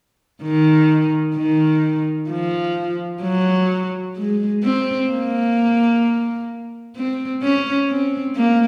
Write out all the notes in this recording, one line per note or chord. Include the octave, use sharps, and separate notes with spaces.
D#3
D#3
F3
F#3
G#3
C4
A#3
C4
C#4
C4
A#3